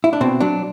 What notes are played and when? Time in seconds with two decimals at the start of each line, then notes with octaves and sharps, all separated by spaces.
0.04 E4
0.13 D4
0.21 B2 C4
0.40 F#3 D4